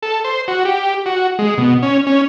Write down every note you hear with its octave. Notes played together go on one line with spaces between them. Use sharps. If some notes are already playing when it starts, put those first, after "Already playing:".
A4
C5
F#4
G4
F#4
G#3
B2
C#4
C#4